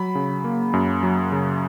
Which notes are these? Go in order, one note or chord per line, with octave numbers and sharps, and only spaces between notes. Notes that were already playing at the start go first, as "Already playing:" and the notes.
Already playing: F#3 B5
C#3
A#3
F#2
F#3
C#3